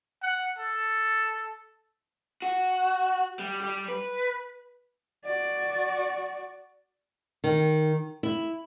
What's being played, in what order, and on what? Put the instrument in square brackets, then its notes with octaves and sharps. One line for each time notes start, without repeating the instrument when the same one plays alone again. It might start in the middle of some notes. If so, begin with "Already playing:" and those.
[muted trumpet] F#5
A4
[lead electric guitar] F#4
G3
G3
B4
[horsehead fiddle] F#4 D5
[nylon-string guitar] D#3
E4